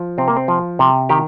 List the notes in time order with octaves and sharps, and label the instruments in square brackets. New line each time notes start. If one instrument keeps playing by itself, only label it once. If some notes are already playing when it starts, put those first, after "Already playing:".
Already playing: [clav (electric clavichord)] F3
C3 C4
A#3
C4
F3
C3
D#3 G4